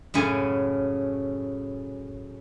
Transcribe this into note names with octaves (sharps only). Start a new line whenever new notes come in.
F#2 A2 C#3 G#5